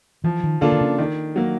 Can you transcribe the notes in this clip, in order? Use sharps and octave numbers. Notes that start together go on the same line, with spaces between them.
E3 F3
D#3
D3 A#3 D4 F4 A4
D3
C#3
D#3
F#3 A#3